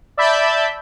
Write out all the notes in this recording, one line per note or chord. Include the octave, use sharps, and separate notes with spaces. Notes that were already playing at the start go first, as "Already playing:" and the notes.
D5 E5 A5 B5 G6